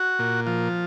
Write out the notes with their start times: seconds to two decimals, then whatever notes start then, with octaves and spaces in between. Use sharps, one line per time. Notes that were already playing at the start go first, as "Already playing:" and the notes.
Already playing: F#4
0.19 A#2
0.47 F3